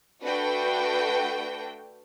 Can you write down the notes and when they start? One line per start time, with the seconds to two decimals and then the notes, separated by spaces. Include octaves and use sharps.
0.24 A3 D4 F#4 B4 G5